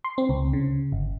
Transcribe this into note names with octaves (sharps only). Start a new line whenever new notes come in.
C6
C4
C#2
C#3
G1